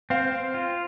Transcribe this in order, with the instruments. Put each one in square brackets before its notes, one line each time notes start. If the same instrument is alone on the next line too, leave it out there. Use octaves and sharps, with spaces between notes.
[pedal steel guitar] C4 [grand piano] C5 F5
[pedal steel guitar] C4
F4